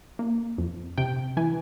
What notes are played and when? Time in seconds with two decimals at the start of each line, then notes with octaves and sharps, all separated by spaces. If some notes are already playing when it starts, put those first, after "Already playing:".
0.19 A#3
0.58 F2
0.97 C3 G5
1.37 E3 G#5